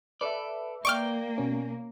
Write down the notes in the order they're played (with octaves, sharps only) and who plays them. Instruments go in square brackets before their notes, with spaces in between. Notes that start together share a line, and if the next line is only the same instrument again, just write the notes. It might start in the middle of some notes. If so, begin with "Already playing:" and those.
[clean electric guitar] A4 D5 [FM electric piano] B4 E5
[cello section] A#3 [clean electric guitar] D5 G5 [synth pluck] C#6 D6 F6
[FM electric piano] B2 C#4